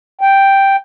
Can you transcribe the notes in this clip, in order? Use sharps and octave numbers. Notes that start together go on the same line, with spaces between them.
G5